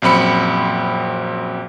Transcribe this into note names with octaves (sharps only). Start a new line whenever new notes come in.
A#1 F#2 C4 B5 C#7